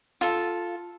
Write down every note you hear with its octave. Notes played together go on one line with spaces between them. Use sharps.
F4 A4